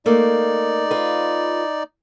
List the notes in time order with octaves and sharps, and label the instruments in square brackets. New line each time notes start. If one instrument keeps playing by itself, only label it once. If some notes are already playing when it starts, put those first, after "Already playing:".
[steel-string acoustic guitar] A3 A#3 [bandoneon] D#4 D5
[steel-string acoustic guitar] F4 B4